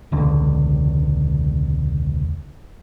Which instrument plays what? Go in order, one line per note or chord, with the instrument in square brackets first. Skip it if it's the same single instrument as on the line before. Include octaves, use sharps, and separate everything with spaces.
[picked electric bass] E1 C#2 D3